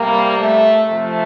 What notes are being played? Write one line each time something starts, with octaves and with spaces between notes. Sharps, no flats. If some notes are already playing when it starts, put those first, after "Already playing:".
Already playing: C3 G3 A#3
A3
C3 F3 A3